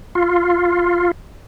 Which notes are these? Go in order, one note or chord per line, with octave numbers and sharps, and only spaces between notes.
F4